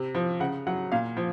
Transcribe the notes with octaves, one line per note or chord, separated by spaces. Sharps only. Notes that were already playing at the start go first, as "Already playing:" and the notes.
Already playing: C3
F3
C#3 F#5
F#3 F#5
A#2 F5
F3